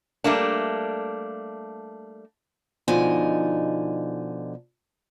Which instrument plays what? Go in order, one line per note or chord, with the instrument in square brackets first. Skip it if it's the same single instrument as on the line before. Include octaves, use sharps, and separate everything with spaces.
[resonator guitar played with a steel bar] G3 A3 A#3 D4
[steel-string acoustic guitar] B2 D3 F3 D#4 G#5